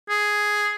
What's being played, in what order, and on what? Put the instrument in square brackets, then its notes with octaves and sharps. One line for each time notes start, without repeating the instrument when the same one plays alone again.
[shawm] G#4